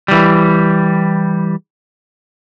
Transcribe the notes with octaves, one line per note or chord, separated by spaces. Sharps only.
E3 G3